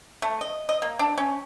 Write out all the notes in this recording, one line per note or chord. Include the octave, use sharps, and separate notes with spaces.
A3
D#5
D#5
A#3
D4
C#4